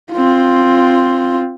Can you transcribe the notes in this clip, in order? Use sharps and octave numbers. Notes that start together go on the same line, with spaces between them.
C4 F4